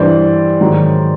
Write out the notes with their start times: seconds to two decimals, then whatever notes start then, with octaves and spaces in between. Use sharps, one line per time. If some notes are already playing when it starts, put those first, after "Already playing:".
Already playing: G2 E3 G3 C5 D5
0.60 G#2 D#3 F#3